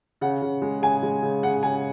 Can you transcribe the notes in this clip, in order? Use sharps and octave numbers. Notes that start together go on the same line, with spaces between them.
C#3 F#5
C#3
G#3
C#3 G#5
G#3
C#3
C#3 F#5
C#3 G#5